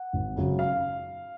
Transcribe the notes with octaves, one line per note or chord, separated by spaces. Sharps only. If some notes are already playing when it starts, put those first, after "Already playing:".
Already playing: F#5
G#1
F#2 C#3 F#3
F5